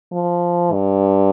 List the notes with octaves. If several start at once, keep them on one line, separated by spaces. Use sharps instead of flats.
F3
G2